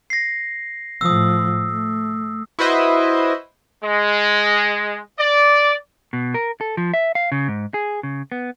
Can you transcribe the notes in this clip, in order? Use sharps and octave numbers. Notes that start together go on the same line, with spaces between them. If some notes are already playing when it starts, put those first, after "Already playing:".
A#6 C7
A2 F3 D#6 E6
A3
E4 F#4 B4 C5 D#5 E5
G#3
D5
B2
A#4
A4
F3
E5
F5
C#3
G#2
G#4
C#3
B3